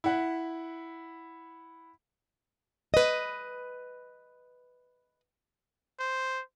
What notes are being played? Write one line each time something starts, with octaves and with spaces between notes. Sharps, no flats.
E4 F#5
B4 D#5
C5